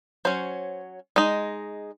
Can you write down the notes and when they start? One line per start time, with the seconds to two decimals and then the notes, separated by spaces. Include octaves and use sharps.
0.25 F#3 C#4 C5
1.16 G#3 D#4